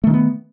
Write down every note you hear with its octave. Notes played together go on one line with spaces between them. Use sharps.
D#3 A3 B3 D4